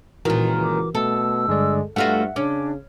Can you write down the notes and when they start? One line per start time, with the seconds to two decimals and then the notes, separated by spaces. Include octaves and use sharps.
0.25 C#2 A#2 D#3 E3 F#4 A#4
0.64 D6
0.95 B2 A3 A4 E6
1.48 G2 D3 G#3 D5
1.96 G2 A3 F4 F#4 A4 E5 F#5
2.36 C#3 C#4 D4 D6